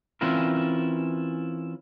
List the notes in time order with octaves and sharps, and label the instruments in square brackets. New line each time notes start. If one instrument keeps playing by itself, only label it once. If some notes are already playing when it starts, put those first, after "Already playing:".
[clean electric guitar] E3 C4 C#4 E4 F4 A#4